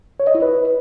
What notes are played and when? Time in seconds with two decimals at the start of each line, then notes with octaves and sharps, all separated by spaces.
0.20 C#5
0.27 D#5
0.35 E4
0.42 B4